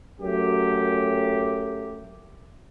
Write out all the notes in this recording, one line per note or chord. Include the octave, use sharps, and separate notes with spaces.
F#2 F#3 A3 G4